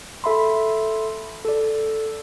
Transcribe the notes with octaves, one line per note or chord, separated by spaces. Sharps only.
A4 E5 B5 C6
A4 D5